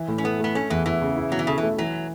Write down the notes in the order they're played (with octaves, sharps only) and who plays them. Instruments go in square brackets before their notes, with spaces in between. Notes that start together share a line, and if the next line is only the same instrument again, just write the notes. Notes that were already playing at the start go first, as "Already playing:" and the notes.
Already playing: [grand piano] E3 E4
A2
[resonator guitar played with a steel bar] C#4
[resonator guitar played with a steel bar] B3 [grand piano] A4
[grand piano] A3 [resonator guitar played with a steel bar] B3
[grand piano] A3 [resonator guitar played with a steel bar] C#4
[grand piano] E2 [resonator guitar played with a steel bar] E3
[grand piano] E2 [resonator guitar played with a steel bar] E3
[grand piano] C#3
E4
[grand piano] B2 [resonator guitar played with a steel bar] F#3
[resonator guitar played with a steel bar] E3
[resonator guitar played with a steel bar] C#3 [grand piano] A4
[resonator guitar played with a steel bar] E3
[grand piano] A3
[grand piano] E3 [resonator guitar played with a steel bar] F#3